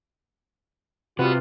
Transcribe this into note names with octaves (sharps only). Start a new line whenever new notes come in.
C3 G3 B3 F4 F#4